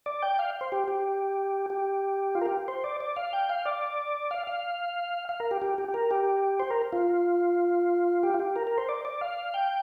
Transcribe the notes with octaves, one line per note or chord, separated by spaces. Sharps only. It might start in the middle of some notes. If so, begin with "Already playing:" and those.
D5
G5
F5
C5
G4
G4
G4
F4
A#4
G4
C5
D5
D5
F5
G5
F5
D5
F5
F5
F5
A#4
G4
G4
G4
G4
A#4
G4
C5
A#4
F4
G4
F4
G4
A#4
A#4
C5
D5
D5
F5
G5